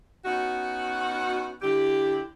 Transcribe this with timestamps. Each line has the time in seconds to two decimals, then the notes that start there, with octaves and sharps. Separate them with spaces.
0.24 B3 C#4 D#4 F#4
1.61 D3 E4 G4